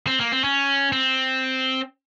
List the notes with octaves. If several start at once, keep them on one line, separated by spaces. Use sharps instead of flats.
C4
A#3
C4
C#4
C4